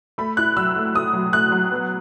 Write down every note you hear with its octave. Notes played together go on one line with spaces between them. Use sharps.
A3 B5
E4 F#6
F#3 E6
A3
A3 D#6
F#3
A3 F#6
F#3
B3